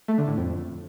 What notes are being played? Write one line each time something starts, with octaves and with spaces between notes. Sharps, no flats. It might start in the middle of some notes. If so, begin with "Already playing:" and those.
A3
D3
A2
F2